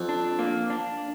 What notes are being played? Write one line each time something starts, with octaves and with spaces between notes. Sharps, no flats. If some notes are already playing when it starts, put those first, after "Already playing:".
Already playing: F2
D4
A#3
D4